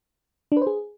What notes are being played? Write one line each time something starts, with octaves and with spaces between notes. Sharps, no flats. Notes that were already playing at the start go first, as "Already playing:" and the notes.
D4
B4
C5
G#4